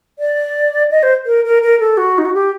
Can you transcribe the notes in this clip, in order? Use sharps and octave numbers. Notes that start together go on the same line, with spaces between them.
D5
D#5
C5
A#4
A#4
A#4
A4
F#4
D#4
F#4
G4